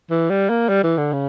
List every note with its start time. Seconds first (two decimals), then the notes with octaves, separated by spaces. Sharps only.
0.10 E3
0.30 G3
0.49 A#3
0.69 G3
0.84 E3
0.98 D3
1.13 C#3